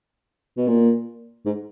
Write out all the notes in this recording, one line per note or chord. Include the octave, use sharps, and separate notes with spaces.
B2
A#2
G#2